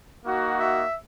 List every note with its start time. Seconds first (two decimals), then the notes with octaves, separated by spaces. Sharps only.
0.25 A#3 D#4 F#4
0.60 E5